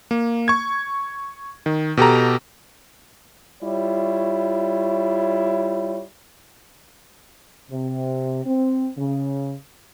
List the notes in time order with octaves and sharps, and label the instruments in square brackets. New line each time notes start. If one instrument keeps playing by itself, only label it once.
[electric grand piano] A#3
C#6 G#6
D#3
B2 G4 A4 A#5
[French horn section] G3 E4 F4 C#5
C3
C4
C#3